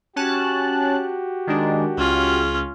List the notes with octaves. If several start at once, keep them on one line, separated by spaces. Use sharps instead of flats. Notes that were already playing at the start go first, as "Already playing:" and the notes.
C#4 F#4 G4 A5 F#6
D#3 G#3 D4
C#2 C#4 F4